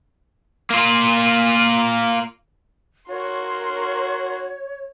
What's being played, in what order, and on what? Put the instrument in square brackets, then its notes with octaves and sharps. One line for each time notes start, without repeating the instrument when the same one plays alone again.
[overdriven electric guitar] A#3 F4
[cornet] F#4 [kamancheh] A#4 C6 [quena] C#5